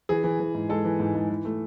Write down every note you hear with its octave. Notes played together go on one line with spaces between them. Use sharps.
E3 G#4
E3
E3
G#2
G#3 A4
E3
G#2
G#2
E3
A3